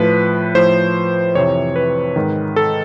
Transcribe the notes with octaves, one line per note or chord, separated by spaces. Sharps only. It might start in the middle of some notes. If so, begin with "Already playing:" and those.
Already playing: A2 F3 B4
A2 F3 C5
F2 C3 E3 C#5
B4
G#2 D#3
A4